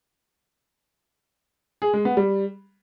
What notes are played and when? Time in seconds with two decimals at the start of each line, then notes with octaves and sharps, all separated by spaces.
1.82 G#4
1.93 G#3
2.05 B3
2.17 G3